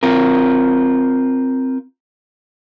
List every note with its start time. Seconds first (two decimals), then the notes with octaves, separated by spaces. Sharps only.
0.03 C4 F4 A#4